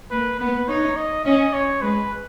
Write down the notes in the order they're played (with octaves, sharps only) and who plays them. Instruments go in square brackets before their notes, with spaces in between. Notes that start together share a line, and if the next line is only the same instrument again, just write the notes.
[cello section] A#3 [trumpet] B4
[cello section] B3 [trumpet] B4
[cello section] D#4 [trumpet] C#5
[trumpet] D#5
[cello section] C#4 [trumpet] D#5
[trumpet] C#5
[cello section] G#3 [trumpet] B4